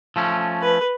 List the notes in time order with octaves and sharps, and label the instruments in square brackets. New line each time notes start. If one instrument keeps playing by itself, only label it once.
[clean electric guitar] F3 A3 C#4
[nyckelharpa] B4